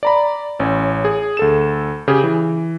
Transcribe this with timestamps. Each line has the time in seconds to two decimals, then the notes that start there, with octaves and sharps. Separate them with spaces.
0.03 D5 A#5 B5
0.59 A1 C#4
1.05 G#4
1.37 D2 A4 E7
2.08 C#3 G4 G#4
2.24 E3